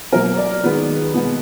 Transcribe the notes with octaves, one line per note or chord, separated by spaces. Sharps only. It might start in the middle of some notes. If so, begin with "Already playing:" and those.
B2 F#3 A#3 A#4
D5
D#3 G#3 B3 B4
B2 G#3 B3